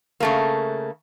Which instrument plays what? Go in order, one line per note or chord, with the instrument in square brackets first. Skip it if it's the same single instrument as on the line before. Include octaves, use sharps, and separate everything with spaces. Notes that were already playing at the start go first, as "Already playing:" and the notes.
[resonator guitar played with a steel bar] C#3 A3 A#3